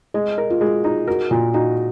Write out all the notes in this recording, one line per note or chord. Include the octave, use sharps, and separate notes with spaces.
G#3 D#5
A#4
F4
G#3 F#4
D#4 F4
F#4 A#4
A#2 F4
D#4 F#4